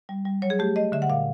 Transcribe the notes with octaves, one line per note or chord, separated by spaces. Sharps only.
G3
G3
F#3 C#5
G#4
A3 G4
A3 D#5
D3 E5
F#5
A#2 F5